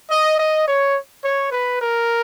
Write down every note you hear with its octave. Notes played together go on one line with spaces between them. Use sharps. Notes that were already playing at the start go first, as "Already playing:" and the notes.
D#5
D#5
C#5
C#5
B4
A#4